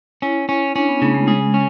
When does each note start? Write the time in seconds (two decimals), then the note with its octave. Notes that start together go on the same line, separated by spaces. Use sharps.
0.22 C#4 E4
0.49 C#4
0.76 C#4 D4
0.89 B3
1.02 C#3 A3
1.14 G#3
1.27 G#3 G#4
1.54 C#4